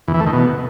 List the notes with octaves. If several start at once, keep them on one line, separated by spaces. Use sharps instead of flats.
E2
E3
A3
D#3
B2